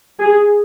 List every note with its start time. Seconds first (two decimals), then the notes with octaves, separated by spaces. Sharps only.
0.20 G#4